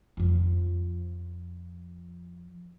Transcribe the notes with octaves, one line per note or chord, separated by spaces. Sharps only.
F2 F3